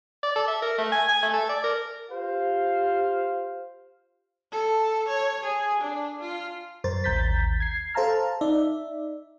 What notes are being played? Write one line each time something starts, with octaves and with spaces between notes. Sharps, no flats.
D5
A4
E5
A#4
A3
G#5
G#5
A3
A4
D5
A#4
F4 G4 C5 F5
A4
C#5
G#4
D4
F4
F#2 A#4 C5 C6 A6
A1 D#2 A#5 G6 A6 B6
G#6 C7
A4 C5 F5 A5 A#5 F6
D#4 D5 E5